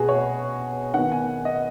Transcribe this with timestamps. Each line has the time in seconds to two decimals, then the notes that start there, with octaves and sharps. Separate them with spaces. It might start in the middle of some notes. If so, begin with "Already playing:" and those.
Already playing: B2 B3 F#4 G#4
0.09 C#5
0.94 D#3 B3 F#5
1.12 G#5
1.45 D#5